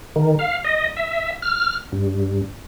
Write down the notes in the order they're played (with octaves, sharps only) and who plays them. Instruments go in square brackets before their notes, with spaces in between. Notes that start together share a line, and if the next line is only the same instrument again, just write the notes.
[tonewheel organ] D#3
F5
D#5
E5
F6
G2